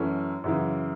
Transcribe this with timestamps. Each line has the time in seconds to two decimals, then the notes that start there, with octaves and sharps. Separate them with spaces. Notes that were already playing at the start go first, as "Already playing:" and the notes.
Already playing: F#2 E3 A3 C#4
0.44 F#2 C#3 E3